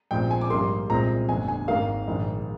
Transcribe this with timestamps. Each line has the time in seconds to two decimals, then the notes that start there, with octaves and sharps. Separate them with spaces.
0.11 A#1 A#2 G#3 C4 G5
0.31 G#5
0.41 D6
0.50 A#1 G#2 G3 A#3 C6
0.90 C2 A#2 G#3 C4 A#5
1.29 G1 F2 D3 G#5
1.48 G#5
1.68 G#1 G#2 D#3 A#3 F5
2.07 A#1 G#2 D#3